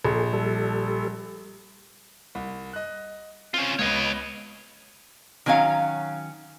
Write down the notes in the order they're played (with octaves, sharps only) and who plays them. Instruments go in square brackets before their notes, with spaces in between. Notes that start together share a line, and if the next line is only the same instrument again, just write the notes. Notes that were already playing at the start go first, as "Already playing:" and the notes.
[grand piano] A#1 [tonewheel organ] G#4 A4
[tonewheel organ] G3 A4
[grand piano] C2
D#5 F#6
[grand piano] C4 [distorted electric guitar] C#4 F4
[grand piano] C#2 B3 A#6 [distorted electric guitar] C#5 D#5
[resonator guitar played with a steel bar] D#3 F#3 C#4 F#4 F5